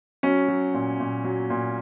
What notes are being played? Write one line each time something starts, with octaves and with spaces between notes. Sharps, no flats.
F#3 C#4
F#3
A#2
A#2
F#3
A#2